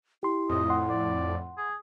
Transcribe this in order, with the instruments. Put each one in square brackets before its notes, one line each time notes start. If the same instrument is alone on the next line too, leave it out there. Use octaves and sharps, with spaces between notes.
[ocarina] E4 [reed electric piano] G4 C6
[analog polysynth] F2 A2 [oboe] D#5
[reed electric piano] F#5 C6
[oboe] D5
G#4